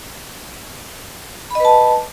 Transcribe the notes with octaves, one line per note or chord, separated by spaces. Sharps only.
B4 D#5 A5 B5